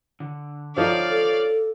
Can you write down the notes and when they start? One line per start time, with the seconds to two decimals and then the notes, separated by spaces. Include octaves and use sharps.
0.20 D3
0.77 D3 F3 D#4 C#5 D5 F5
1.09 A4